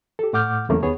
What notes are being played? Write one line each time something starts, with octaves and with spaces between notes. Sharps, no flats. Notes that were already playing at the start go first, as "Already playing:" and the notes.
G4 A4
A2 A3 F#5 D6 F6 G6
E2 C#3 G3 A3 A#3 C#4
D#2 B3 G#4 C#5